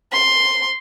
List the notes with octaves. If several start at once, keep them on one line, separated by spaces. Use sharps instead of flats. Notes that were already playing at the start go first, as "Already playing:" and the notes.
C6